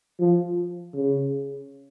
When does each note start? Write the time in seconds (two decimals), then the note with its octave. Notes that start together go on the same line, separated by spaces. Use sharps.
0.19 F3
0.94 C#3